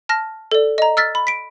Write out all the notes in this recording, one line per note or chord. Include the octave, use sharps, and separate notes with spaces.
A5 F6 A#6
A4 D5
D#5 A#5
E6 F6 A6 B6
B5
B6 D7